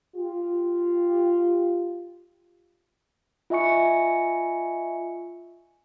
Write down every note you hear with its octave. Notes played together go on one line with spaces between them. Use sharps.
F4 G4
F4 D#5 E5 G#5 C#6 C#7